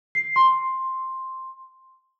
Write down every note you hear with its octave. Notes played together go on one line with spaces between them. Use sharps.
C7
C6